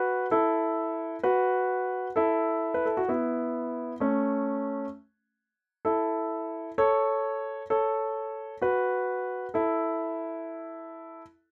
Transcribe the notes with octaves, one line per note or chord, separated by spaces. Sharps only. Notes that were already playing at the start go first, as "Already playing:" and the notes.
Already playing: F#4 B4
E4 A4
F#4 B4
E4 A4
B4
A4
F#4
B3 E4
A3 C#4
E4 A4
A4 C#5
A4 C#5
F#4 B4
E4 A4